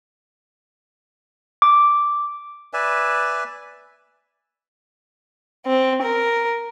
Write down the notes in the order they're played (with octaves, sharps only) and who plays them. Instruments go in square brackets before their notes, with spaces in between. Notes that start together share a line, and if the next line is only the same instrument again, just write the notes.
[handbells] D6
[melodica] B4 D5 E5 G#5
[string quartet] C4
A#4